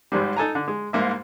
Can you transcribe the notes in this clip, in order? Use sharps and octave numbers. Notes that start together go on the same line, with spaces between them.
G#1 G#2 G3
D#4 A4 G#5 A#5
D3
G#3
C2 G#2 A#3 E5